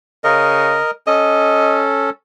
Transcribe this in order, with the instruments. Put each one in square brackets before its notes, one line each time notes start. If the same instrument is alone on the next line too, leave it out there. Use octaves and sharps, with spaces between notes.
[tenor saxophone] C#3 [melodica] A#4 D#5
[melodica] C#4 A4 [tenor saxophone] D#5